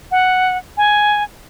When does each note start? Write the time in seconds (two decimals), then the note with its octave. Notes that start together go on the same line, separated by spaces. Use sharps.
0.11 F#5
0.77 G#5